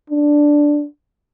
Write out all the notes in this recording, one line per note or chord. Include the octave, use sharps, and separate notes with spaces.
D4